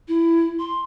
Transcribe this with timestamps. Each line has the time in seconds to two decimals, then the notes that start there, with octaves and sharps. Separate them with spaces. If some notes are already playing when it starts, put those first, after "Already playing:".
0.08 E4
0.59 C6